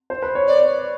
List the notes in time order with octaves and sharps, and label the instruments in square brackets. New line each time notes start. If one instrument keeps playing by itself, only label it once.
[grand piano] C5
B4
C#5
[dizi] D5